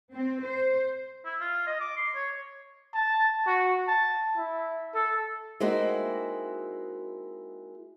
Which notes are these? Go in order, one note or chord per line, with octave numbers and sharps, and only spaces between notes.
C4
C5
E4
F4
D#5
D6
C6
C#5
A5
F#4
A5
E4
A4
G#3 A#3 C4 D#4 E4 F#4